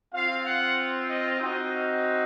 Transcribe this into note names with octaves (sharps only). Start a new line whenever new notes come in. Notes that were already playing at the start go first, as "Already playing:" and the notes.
C4 F4 F5
F#5
D#5
C4 D#4 F#4 D#5
F5